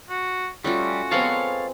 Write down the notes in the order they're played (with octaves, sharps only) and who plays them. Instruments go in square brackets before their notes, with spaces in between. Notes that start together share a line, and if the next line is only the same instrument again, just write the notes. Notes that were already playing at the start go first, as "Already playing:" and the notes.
[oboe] F#4
[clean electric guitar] G3 [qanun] A3 C#4 F4 [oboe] F#4
[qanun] G#3 B3 C4 [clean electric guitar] A4 C#5 F5